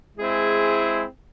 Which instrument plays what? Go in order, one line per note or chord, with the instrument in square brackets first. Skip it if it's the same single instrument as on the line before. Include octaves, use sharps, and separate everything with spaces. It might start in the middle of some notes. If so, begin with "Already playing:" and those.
[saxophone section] G#3 C4 E4 G#4